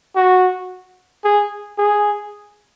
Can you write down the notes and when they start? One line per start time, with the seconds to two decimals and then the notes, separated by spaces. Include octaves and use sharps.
0.16 F#4
1.25 G#4
1.78 G#4